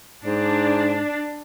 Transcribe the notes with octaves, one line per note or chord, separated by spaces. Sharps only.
G#2 D4